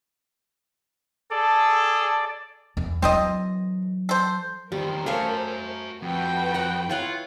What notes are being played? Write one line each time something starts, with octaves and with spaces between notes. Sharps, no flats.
G#4 A4 D5
E2
E3 F#3 C4 A4 D#5
A4 C5
E2 D#3 G3 A#4 C5
A3 F#4 C#5 F5 G#5
F2 F#4 B4 G5
F#5 A#5
E4 F4 C#5 F#5